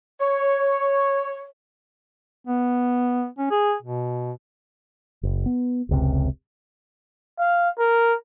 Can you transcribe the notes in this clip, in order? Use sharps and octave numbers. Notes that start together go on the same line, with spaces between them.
C#5
B3
C#4
G#4
B2
F#1
B3
F1 C#2 C3
F5
A#4